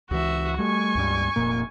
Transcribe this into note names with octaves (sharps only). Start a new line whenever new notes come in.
C#2 E3 F#4 E5
G3 A3 G#5 C#6
C#2 G2 G3
F1 A#2 A#3